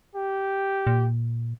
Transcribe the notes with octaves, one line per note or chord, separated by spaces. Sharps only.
G4
A#2